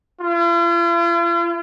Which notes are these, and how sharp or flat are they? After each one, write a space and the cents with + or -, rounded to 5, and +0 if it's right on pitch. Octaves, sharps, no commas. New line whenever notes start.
F4 -45